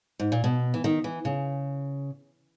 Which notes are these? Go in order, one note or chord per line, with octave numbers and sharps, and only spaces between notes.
G#2
A#2
B2
E3
D#3
E3
C#3